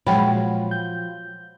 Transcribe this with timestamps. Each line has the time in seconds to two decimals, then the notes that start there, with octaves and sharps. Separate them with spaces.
0.07 A#2 F3 F#3 G#3 F#4 C#5 G5 B5
0.71 G6